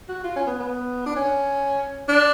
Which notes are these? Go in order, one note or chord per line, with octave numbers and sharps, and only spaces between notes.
F#4
F4
C#4
B3
B3
D4
C#4
D4